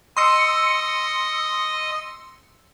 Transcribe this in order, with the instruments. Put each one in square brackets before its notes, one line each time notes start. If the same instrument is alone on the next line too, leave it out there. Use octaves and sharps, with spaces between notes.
[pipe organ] D#5 [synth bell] C6 E6 C#7